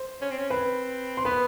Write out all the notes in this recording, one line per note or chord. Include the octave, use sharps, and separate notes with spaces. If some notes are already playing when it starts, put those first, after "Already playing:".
Already playing: C5
C#4
C4
C#4
C4 B4 B5
C6
B3 B4 B5